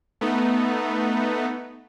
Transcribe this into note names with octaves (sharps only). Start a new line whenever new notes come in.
A3 B3 D#4